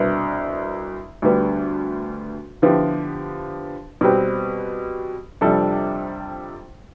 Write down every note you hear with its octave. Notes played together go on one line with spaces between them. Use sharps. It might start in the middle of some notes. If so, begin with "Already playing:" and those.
Already playing: C2 B2 B3 D4
D2 D3 G3 B3
D3 F3 B3 E4 G4
B2 G3 C4 G4 B4
F2 C3 G3 D4 A4